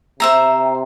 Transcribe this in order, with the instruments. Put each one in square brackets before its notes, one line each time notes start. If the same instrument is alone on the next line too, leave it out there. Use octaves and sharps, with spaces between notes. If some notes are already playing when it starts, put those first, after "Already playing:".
[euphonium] C3 [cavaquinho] C5 E5 A#5